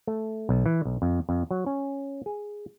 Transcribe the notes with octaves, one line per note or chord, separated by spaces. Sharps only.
A3
B1
E3
B1
F2
F2
F#3
C#4
G#4